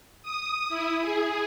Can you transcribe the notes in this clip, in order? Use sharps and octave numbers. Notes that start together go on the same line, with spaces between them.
D#6
E4
G#4